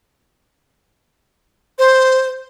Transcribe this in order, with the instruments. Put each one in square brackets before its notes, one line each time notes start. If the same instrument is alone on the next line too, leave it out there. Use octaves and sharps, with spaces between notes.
[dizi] C5